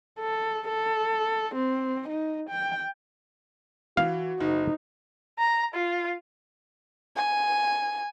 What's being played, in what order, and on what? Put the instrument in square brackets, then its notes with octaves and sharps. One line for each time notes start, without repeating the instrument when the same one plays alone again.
[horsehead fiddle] A4
A4
C4
D#4
G5
[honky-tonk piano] E3 [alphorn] F#4 [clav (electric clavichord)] F5
[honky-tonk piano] F#1 [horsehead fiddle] D#4
[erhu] A#5
F4
[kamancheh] G#5